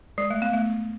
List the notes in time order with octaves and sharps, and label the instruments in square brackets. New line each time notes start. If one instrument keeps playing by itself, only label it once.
[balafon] G#3
A3
B3
A3